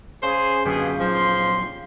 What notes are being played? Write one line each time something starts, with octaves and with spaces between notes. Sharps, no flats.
C#3 G#4 C5
F#2 B2 D3 F4 G4 G#4
A#1 F3 F#3 C6